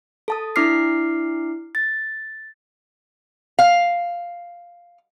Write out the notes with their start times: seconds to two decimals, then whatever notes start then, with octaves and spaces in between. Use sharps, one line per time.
0.28 A4 A5 D#6
0.56 D4 E4 D6 F6 C7
1.75 A6
3.59 F5